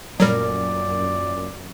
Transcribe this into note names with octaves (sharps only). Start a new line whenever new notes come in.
F#2 A#2 F#3 G3 A#4 D5